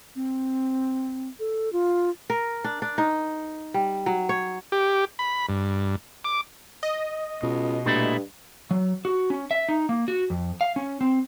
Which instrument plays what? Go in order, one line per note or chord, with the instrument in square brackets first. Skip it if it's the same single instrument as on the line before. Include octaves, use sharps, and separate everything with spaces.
[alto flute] C4
A4
F4
[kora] A#4
D4
D4
D#4
G3
F#3
C#5
[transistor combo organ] G4
B5
G2
D6
[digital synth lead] D#5
[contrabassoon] C#2 [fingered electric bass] B2
[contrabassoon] G2 [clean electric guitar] A#2 A3 E4
[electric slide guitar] F#3
F#4
C#4
E5
D#4
A#3
F#4
F2
F5
C#4
C4